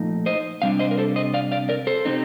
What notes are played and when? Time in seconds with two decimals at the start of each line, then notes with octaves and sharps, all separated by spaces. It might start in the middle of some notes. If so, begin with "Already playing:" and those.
Already playing: A#2 F3 A3 D#4
0.26 C5 D#5
0.62 C3 G3 D4 F5
0.79 C5 D#5
0.91 A#4
0.97 A4 C5
1.16 C5 D#5
1.34 D5 F5
1.52 D5 F5
1.69 A#4 D5
1.87 A4 C5
2.05 C3 G3 C4 D#4